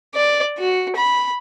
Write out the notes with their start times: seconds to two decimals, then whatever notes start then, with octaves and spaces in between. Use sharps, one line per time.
0.15 D5
0.58 F#4
0.96 B5